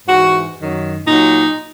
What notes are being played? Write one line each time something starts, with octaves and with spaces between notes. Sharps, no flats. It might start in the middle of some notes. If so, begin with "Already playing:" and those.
G#2 E3 F#4
F#2 D#3 F#3
A#2 F#3 D#4